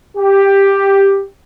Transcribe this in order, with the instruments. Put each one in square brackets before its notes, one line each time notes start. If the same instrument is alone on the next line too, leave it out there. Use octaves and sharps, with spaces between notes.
[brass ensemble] G4